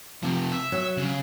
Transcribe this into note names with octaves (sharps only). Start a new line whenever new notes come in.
C3 F3
E5
F#3
C#3